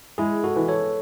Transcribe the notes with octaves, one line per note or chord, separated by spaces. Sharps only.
G#3 E4 G#4
F#4 A4
E3
A4 C#5